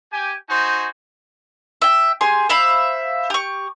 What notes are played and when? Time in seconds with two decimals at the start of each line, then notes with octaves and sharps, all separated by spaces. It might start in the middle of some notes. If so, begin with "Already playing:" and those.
0.12 G4 G#5
0.50 D#4 F#4 C5 G#5
1.82 E5 G5
2.21 G4 G#4 G#5 C6
2.49 C5 E5 F5 B5
3.30 G4 C#6